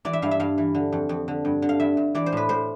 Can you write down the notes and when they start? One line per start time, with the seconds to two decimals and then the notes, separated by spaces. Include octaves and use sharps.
0.05 E3 D5
0.13 E5
0.22 G2 F5
0.31 E5
0.40 G2 F5
0.58 E3
0.75 D3
0.92 F2
1.09 F2
1.28 D3
1.45 G2
1.62 D3
1.69 F5
1.80 G2 E5
1.97 G2
2.15 E3 D5
2.26 C5
2.32 A2 B4
2.49 A2 C5